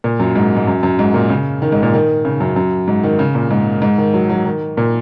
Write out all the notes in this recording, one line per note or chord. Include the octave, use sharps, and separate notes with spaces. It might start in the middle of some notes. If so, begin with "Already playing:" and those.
A#2
F#2
G#2
G#2
F#2
F#2
G#2
A#2
C#3
D#3
G#2
A#2
D#3
C#3
F#2
F#2
G#2
D#3
C#3
A#2
G#2
G#2
D#3
F#3
F#3
D#3
A#2